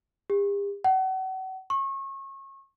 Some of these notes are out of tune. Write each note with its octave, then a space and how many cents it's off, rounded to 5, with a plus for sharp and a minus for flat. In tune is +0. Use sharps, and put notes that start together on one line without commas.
G4 +45
F#5 +35
C#6 -30